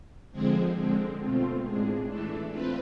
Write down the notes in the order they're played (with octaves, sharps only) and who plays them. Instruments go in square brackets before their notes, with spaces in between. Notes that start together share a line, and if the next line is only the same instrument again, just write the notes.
[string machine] D3 F3 G#3 C4 G#4
D3 G#3 C4
B2 A3 C4 F4
A2 G#3 D4 G#4
E3 A3 D4 A4
C4 F4 B4